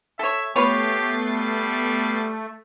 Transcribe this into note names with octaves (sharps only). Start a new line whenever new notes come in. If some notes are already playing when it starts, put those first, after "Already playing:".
A4 C#5 E5
A3 B3 F4 G4 B4 C#5 A6 C7
G3